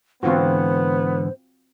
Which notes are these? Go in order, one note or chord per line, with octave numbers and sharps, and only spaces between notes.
G#2 D3 E3 B3 C4 F4 F#4 C5